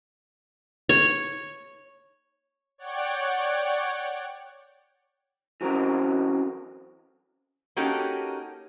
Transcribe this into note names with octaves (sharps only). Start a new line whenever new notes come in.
C#5
C#5 D5 F#5 G5
E3 F#3 C4 C#4 A#4
A#3 C#4 D#4 F#4 G4 A4